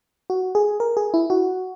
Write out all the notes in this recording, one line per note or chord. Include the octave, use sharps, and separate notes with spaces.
F#4
G#4
A#4
G#4
E4
F#4